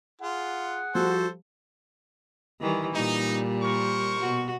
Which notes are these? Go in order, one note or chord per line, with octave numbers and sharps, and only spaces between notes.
F4 G#4 F#5
F3 G3 F#4 A4 C5
D#3 E3 G3
A#2 G3 D#4
A#4 C5 C#6
B2 F#4